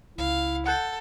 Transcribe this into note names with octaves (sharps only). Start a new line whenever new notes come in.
C#2 E4 F5
A4 F#5 F#6 G6